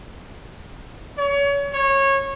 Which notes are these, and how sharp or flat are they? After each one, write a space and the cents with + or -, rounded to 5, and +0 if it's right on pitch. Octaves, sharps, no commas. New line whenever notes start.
C#5 +30
C#5 -20